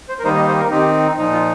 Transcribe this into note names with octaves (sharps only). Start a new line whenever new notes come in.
C5
A#4
D#3 G3 A#3 D#4 C5
D#5
C5
A#4
D#3 C4 D#4 G4
A#2 F3 D#4
F4